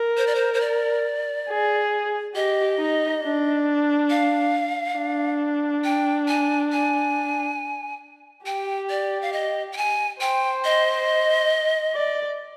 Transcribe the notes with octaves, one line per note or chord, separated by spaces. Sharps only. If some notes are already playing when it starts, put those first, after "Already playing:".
Already playing: A#4
C5
D5
C5
C5
D5
G#4
G4 D#5
D#4
D4
F5
D4
G5
G#5
G#5
G4 G5
D5
F5
D#5
G5
G#5
C5 G5
D#5
D5